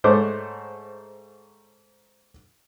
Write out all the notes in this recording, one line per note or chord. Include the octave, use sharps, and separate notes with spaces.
G#2 A3 C5 C#5 C#6 D6